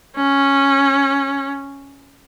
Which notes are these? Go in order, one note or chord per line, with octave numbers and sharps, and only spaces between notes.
C#4